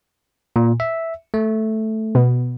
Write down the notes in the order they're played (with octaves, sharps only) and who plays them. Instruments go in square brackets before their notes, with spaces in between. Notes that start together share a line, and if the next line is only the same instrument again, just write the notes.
[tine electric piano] A#2
E5
A3
[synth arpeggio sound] B2